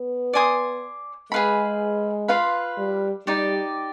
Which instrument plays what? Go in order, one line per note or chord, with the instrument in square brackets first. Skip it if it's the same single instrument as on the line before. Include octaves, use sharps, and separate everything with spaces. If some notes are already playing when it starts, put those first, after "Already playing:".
Already playing: [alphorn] B3
[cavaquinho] D5 G#5 C6 D#6
[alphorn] G#3 [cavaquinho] G#4 B4 F5 B5
[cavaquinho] F4 B4 F5 C6
[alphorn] G3
[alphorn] G3 [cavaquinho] D#4 G4 D5